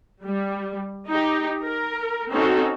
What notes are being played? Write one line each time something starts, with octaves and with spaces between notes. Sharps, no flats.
G3
D#4 G4
A#4
C4 C#4 D#4 F#4 A4